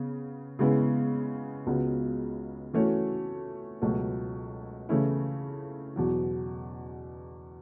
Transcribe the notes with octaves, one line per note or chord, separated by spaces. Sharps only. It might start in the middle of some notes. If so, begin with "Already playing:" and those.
Already playing: C#3 B3
C#3 G#3 B3 E4 G#4
C#2 C#3 G#3 B3 F#4
E3 A3 C#4 F#4 C#5
C#2 B2 F#3 A3
C#3 E3 A3 C#4 E4
E2 B2 F#3